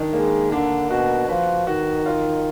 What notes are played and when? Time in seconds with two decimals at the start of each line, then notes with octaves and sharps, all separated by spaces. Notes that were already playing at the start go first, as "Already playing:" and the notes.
Already playing: D#3 D4
0.13 G#3 A#3
0.52 D3 D4
0.90 B2 F#4
1.29 F3 B4
1.67 D#3 F#4
2.06 F4